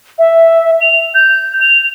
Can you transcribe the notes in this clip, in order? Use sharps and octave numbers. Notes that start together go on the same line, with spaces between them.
E5
F7
G6
F7